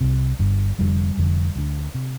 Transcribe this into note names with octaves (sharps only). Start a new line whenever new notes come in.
C2 C3
G1 G2 D3
F1 F2 D3 G3
F1 F2 D3
D2 D3
C3